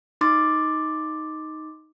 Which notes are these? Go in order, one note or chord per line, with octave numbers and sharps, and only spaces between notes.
D#4 C6 D6 A6